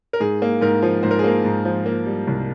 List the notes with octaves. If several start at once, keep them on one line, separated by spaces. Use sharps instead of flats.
A#4
G#2 G#4
A#3
G#2 A#4
F3
G#2 C5
A#4
G#4
A#3 A#4
G#2
F3
A#3
G3
C2